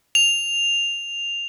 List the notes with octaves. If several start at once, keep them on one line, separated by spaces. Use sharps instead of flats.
F7